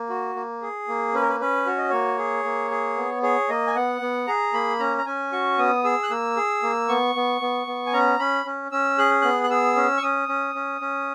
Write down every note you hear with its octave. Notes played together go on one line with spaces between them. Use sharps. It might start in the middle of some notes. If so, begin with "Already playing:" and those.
Already playing: A#3
F#4
A#3
G#4
A#3
C#4 B4
A#4
B4
C#4 B4
F#4 C#5
D#5
A#3 C#5
G#4
A#3
G#4
B3
G#4 C#5
A#3 D#5
G#5
B3 F#5
B3
G#4 A#5
A#3 B5
C#4 A#5
A#5
C#4 G#5
F#4 C#6
B3 D#6
G#4 E6
F#6
A#3 E6
G#4
A#3
B3 C#6
B3
B3
B3
G#5
C#4 A#5
C#4 B5
C#4
C#4 E6
G#4 F#6
B3 F#6
F#6
G#4 E6
C#4
C#6
C#4 D#6
C#4
C#4
C#4